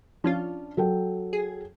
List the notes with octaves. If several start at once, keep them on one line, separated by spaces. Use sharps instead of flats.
F3 C#4 D4 F4
F#3 A4 G5
G#4